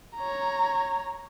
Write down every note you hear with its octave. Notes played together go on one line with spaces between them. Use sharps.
C#5 A#5